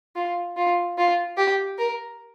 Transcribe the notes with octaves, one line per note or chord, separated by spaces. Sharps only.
F4
F4
F4
G4
A#4